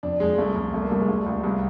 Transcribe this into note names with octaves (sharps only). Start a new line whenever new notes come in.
F2 D4
F2 G#3
C2 A3
C2
C2 A3
A#3
C2 A3
G#3
G3 A3
C#2
C2